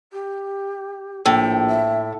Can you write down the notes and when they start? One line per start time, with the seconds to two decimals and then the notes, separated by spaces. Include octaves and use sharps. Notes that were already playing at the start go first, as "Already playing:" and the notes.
0.12 G4
1.26 A#1 A2 G5
1.67 E5